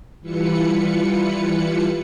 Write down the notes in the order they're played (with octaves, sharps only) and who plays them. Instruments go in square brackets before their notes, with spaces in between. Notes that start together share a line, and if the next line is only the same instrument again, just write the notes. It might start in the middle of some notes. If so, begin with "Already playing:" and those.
[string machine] E3 G3 E4 F4 B4 C#7